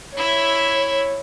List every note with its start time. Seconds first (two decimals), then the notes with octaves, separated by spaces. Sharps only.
0.17 E4 C#5 E5